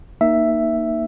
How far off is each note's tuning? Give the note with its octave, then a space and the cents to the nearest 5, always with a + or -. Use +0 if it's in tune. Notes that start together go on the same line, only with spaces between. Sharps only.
A#3 +0 D#4 +0 E5 +5